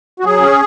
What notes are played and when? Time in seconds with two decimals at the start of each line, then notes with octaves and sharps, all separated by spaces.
0.20 F#4
0.25 F#3 G#4
0.41 C#4